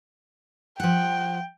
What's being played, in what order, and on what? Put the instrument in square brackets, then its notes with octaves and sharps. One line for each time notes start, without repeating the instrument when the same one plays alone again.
[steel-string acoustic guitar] F3 F#5 [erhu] G5